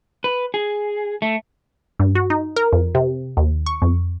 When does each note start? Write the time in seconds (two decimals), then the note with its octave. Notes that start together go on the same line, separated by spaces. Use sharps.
0.24 B4
0.54 G#4
1.22 A3
2.00 G2
2.15 F#4
2.30 D#4
2.56 A#4
2.73 F2
2.95 C3
3.37 D#2
3.66 C#6
3.82 F2